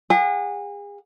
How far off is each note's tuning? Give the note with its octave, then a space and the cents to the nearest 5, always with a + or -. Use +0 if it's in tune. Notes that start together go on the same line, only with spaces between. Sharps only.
G#4 -35 F#5 -25